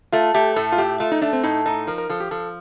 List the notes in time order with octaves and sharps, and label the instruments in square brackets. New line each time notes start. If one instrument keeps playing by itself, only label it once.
[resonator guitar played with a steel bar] A3 [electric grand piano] F4
[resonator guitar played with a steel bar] A3 [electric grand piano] G4
[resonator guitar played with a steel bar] A2 [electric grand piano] A4
[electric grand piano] F4
[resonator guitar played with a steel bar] A3 [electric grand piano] G4
[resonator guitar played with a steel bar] A3 [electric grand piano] F4
[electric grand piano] D#4
[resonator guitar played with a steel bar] A3 [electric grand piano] D4
[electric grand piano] C4
[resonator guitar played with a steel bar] A2 [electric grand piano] D#4
[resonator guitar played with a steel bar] D#4 [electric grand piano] A4
[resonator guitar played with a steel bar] F3 [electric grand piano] A#4
[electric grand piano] A#4
[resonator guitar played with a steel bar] F3 [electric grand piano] A4
[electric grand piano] G4
[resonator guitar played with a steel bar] F3 [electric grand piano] A4